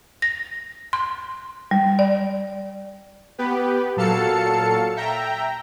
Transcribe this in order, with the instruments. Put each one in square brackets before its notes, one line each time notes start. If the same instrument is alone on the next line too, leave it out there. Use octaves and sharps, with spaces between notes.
[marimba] A#6
C6
G3
D5
[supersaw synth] B3 G4 B4
A#2 F#3 A4 F5 A5 C#7
E5 G5 A#5